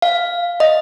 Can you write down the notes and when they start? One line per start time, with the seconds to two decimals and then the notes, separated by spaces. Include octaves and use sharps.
0.02 F5
0.60 D#5